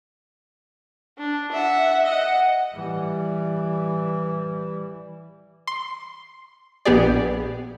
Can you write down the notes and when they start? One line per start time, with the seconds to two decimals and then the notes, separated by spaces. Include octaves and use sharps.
1.18 D4
1.52 E5 F#5
2.05 D#5 F#5
2.74 E3 G3
5.67 C6
6.85 A#1 B3 G4 G#4 D5